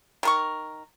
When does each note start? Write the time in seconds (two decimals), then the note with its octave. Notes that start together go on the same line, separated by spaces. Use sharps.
0.23 D#3 A#4 C#6